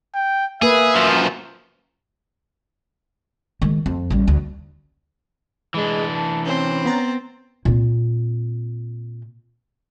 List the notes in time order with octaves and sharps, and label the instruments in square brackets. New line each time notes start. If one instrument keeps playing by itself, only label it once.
[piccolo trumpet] G5
[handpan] A#3 B4 [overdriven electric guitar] G#4 [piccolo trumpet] E5
[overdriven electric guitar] F#2 F3
[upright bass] D#3 G#3
F2
A1 G3
D2
[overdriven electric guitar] E3 D4 [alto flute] G#3
[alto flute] A5
[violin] C4 [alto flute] C#4
[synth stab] B3 A#5 A6
[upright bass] A#2 C4